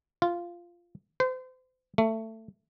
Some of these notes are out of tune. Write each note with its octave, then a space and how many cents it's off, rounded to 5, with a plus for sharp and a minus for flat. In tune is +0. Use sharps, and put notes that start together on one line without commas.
F4 -10
C5 -35
A3 +20